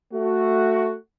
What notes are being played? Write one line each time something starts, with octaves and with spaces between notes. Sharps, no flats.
A3 F#4